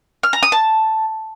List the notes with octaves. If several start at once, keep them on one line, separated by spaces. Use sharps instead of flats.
F6
A#5
D#6
A5